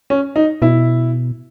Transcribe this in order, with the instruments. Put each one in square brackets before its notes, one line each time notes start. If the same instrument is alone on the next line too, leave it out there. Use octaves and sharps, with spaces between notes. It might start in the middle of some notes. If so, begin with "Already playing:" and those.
[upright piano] C#4
D#4
[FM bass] B2 [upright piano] E4